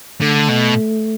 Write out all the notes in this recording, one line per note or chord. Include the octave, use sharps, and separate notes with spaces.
D3 A3
B2